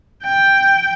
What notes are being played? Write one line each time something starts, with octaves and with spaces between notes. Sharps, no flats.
G5